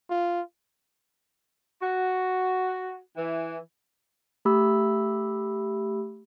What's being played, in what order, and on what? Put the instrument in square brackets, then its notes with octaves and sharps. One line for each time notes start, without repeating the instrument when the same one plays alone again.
[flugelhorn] F4
[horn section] F#4
E3
[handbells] A3 G4 B5 E6